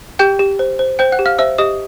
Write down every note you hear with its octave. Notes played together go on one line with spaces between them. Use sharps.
G4 G5 G6
G4
C5
C5
C5 G5 G6
F#5 F#6
G4
F5 F6
C5 E5 E6
G4 D#5 D#6